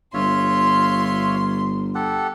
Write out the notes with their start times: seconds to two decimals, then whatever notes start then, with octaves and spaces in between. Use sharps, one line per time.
0.14 G1 F4 C#5 E5 C6
1.95 G4 A4 F#5